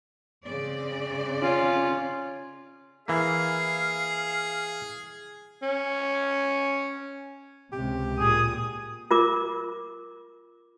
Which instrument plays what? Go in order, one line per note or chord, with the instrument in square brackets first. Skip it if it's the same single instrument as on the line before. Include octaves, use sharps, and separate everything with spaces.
[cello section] C#3 C4 D5
[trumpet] C#4 [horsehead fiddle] F4
[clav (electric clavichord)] E3 A#3 [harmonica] G#4 [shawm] F5
[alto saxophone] C#4
[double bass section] C#2 C3 [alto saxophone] G4
[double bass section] A#2 [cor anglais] G#4 [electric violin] D#6
[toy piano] F4 A#4 D6